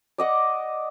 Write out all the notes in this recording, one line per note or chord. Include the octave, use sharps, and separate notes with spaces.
D5 D#5 F#5